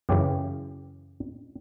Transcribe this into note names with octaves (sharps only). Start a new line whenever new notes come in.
F#2 C#3 E3 G4